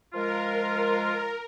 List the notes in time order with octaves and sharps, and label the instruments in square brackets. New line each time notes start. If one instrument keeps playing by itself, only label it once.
[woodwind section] F3 G#3 F4 [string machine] A#4